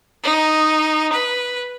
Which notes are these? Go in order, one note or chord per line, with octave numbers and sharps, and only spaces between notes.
D#4
B4